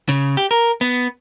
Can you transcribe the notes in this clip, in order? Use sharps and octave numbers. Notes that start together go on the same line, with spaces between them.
C#3
G4
A#4
B3